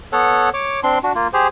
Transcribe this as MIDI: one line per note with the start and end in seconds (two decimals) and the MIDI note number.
0.13 0.49 59
0.13 0.49 69
0.13 0.49 73
0.13 0.49 78
0.54 0.80 73
0.54 0.80 86
0.83 0.98 60
0.83 0.98 62
0.83 0.98 84
1.03 1.13 62
1.03 1.13 66
1.15 1.28 58
1.15 1.28 65
1.33 1.48 67
1.33 1.48 68
1.33 1.48 72